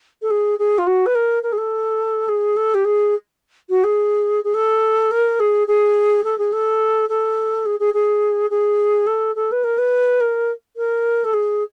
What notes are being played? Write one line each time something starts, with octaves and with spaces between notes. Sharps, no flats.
A4
G#4
G#4
F4
F#4
B4
A#4
A#4
G#4
A4
G#4
A4
G4
G#4
F#4
G#4
G#4
A4
A#4
G#4
G#4
A4
G#4
A4
A4
G#4
G#4
G#4
G#4
A4
A4
B4
A#4
B4
A#4
A#4
A4
G#4